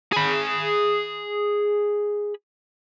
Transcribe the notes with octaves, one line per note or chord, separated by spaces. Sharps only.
G#4 B5